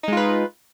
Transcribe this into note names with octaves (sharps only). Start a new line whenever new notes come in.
G#3 D#4 F4 B4